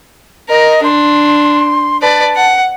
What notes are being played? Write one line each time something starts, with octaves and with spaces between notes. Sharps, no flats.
A#4 D#5
D4 C6
B4 D5 A5
F#5